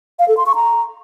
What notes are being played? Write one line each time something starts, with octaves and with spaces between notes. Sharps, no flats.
F5
A4
C6
C#6
A#5